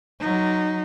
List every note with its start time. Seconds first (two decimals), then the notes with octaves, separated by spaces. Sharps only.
0.20 F#3 D#4